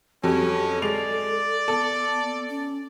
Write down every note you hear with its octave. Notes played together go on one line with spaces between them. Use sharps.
F2 F#3 G3 C#4 A4
G#3 D5 C7 F7
B3 A4
C#4